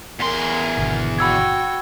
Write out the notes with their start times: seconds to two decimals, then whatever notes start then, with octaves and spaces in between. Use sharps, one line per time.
0.20 E2 G#4 A#4 C6
0.77 G#1 B2 D3
1.18 F#4 G5 B5 E6 G#6